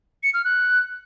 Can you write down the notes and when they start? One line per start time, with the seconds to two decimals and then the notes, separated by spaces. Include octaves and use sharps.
0.23 C#7
0.34 F6
0.44 F#6